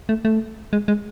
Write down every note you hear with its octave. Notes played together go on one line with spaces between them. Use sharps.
A3
A3
G#3
G#3